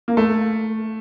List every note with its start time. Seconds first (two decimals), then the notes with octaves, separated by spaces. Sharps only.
0.08 A#3
0.17 A3